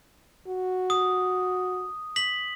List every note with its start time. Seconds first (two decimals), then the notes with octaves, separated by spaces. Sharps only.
0.48 F#4
0.90 D#6
2.16 B6 F#7